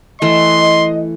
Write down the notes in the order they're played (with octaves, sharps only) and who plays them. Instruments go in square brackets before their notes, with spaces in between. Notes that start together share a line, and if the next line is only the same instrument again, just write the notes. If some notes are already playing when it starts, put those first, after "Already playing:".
[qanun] E3 A3 [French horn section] D#5 [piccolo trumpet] C6